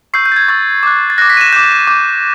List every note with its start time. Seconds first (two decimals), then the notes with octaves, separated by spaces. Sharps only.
0.14 C#6 E6 G6 C7
0.26 G6
0.32 A6
0.36 G#6
0.48 C#6 E6 G6 A6
0.83 D6 F#6
1.10 A6
1.18 F#6 A#6
1.22 D6
1.30 B6
1.37 D#7
1.41 E7
1.52 D6 G6 E7
1.87 D6 G6